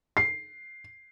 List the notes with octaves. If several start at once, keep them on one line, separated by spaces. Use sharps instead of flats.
C7